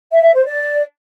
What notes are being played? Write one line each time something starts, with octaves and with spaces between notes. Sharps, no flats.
E5
E5
C5
D5